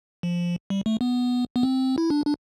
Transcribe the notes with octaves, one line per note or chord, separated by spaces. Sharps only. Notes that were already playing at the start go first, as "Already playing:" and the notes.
F3
G3
A3
B3
B3
C4
E4
D4
D4